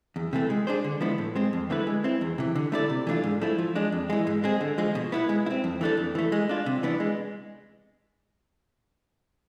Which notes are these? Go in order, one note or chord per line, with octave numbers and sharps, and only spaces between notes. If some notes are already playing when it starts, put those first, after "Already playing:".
E2
C3 E3 A3
G#3
D4 G#4 C5
D3
F3 G#3 B3 E4
A2
G#3 C4
F2
D3 A3 E4 B4
G#3
C4 E4
E2
C3 E3
D3
A3 E4 A4 D5
C3
E3 A3 D4 F4
G#2
F3 A3 E4
F3
G#3 D4
F2
E3 G#3
G#2
G#3 C4 G#4
D3
F3 G#3
B2
B3 E4 B4
G#3
E4
C4
F2
E3 A3 D4 A4
F2
E3 A3
G#3
D4 F4
C3
E3 B3 D4
G#3